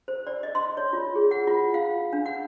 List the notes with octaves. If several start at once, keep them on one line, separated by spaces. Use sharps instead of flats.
C5
D5
D#5
C6
C#5
F4
G#4
F#5
F4
F5
D4
F#5